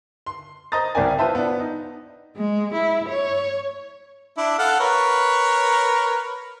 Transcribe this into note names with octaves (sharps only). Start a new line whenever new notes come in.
C6
C5 D#5 A#5 D#6 A6
C2 G3 C4 A#4 D5 G#5
F4 B4 C5 E5 A5
B3 D4
D#4
G#3
E4
C#5
D4 E4
A4 F5 F#5
A#4 B4 C#5